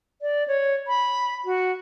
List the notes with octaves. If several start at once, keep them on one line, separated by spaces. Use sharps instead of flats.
D5
C#5
B5
F#4